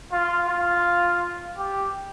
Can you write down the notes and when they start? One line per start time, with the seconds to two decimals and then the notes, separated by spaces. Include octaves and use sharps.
0.12 F4
0.48 F4
1.58 G4